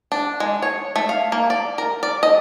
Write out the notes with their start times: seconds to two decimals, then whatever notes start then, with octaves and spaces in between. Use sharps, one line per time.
0.12 D4
0.40 G#3
0.62 C#5
0.96 A3
1.09 F5
1.32 A#3
1.50 D5
1.78 A#4
2.03 D5
2.23 D#5